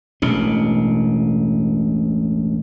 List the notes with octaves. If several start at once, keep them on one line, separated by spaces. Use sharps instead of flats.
E1 A1 B2